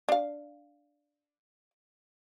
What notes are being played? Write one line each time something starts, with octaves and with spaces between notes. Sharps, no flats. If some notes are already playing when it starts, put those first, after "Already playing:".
D4 F5